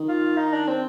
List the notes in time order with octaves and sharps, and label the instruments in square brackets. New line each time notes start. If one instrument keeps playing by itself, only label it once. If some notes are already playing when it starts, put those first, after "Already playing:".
Already playing: [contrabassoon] D#3
[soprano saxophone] F4
D#4
D4
C4